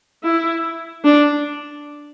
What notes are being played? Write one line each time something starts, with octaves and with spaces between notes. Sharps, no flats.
E4
D4